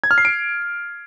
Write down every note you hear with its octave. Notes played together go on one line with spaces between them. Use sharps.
G#6
F6
C7
D7